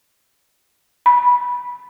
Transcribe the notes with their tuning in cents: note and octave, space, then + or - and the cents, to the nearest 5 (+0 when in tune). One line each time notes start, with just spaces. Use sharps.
B5 -15